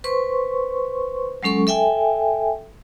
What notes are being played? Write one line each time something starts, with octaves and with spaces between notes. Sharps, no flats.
B4 C5 C6 C#6
F#3 G#3 C#4 A4 C#6
A4 E5 G5 G#5